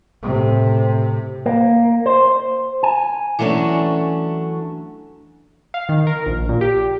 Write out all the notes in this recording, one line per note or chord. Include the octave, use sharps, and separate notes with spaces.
A2 C3
A#3
C5
G#5
E3 F#3 G3 A3 C#4 D4
F5
D#3
A#4
A#1
A#2
G4